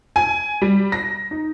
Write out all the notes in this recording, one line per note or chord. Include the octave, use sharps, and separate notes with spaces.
G#5
G3
A#6
D#4